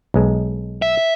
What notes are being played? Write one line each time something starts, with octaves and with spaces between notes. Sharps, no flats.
B1 G#3
E5